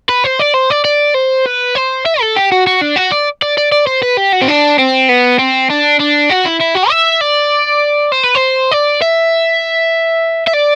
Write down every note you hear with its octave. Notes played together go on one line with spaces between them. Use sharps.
B4
C5
D5
C5
D5
D5
C5
B4
C5
E5
A4
G4
F#4
F#4
D4
F#4
D5
D5
D5
D5
C5
B4
G4
F#4
C4
D4
C4
B3
C4
D4
D4
F#4
E4
E4
F#4
E5
D5
C5
B4
C5
D5
E5
E5
D5